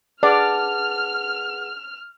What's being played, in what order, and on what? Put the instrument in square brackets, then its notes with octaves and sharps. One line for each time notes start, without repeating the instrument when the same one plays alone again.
[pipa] D4 [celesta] G#4 B4 F#5 [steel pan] D5 [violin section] F6